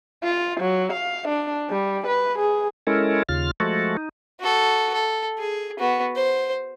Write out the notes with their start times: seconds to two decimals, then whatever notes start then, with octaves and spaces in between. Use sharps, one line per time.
0.23 F4
0.60 F#3
0.93 F5
1.28 D4
1.70 G3
2.07 B4
2.38 G#4
2.87 G#3 C#4 E4 A4 A#4
3.29 D#2 C#3 F4 F6
3.60 F3 G#3 A3 F#4 A4
3.97 D#4
4.40 F#4 A4
4.94 A4
5.38 G#4
5.79 B3 F#4
6.16 C5